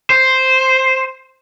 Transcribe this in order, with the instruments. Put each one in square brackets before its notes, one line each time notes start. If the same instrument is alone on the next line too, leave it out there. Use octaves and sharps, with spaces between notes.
[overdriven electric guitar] C5